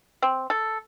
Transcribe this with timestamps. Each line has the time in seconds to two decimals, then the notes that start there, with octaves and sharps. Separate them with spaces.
0.22 C4
0.50 A4